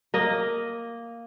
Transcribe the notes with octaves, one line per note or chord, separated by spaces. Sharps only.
A#3 D#5